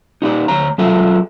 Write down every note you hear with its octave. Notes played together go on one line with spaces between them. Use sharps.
D#4 G4 D5
D2 C#5 A#5
F#3 F4 G#4 A4 E5